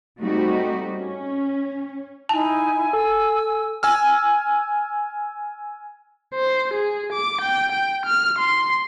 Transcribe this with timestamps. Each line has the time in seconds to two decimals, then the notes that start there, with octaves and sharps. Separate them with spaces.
0.20 G3 A3 C4 D#4 F#4 G4
0.95 C#4
2.29 D#4 E4 G#5 A5
2.93 A4 E6
3.83 G#5 E6 F6
6.35 C5
6.74 G#4
7.13 D6
7.42 G5
7.72 G5
8.06 F6
8.39 C6